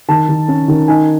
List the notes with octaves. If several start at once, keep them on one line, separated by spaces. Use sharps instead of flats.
D#3 A5
D#3
C#4
D#3
D#4 G#5